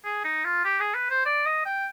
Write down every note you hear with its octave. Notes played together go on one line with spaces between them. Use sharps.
G#4
D#4
F4
G4
G#4
B4
C5
D5
D#5
G5